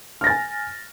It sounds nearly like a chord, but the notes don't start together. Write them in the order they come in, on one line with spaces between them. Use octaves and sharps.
F6 A#6 A6 G#5